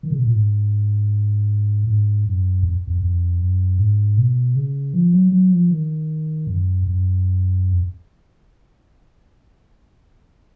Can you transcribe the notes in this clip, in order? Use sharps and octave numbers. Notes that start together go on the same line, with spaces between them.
D#3
C#3
B2
A#2
G#2
G#2
F#2
F2
F2
F2
F#2
G#2
B2
C#3
F3
F#3
F#3
F3
D#3
F#2
F#2
F2